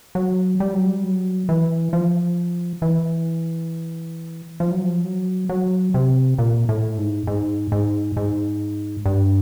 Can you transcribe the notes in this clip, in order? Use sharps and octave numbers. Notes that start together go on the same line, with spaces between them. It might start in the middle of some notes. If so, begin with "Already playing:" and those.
F#3
G3
F#3
G3
F#3
E3
F3
E3
F3
F#3
F3
F#3
F#3
C3
A#2
A2
G#2
G#2
G#2
G#2
G2